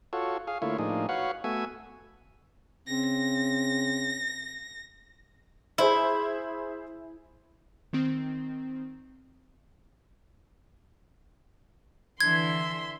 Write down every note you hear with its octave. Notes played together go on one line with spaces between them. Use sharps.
F4 F#4 A4 C#5
G#4 F5
D3 A3 A#3 E4 F4 C#5
A2 F3 A#3 D4 D#4 G#4
F#4 B4 C#5 F5 F#5
A3 B3 F#4 E5 G#5
C#3 C4 A#6
E4 G#4 C5 E5
D#3 C4
D3 E3 E5 C6 G#6